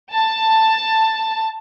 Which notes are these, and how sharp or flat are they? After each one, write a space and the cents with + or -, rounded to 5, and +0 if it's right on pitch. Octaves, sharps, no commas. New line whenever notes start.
A5 +10